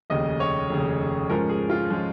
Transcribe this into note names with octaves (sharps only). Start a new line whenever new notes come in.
F1 D#2 C#3 D#5
C#5
F1 D#2 C#3
G#2 F3 G#3 C#4 A#4
G#4
F4
F3 G#3 C#4